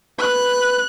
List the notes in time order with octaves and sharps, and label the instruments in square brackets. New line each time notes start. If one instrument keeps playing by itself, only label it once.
[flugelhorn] B4 [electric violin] F#6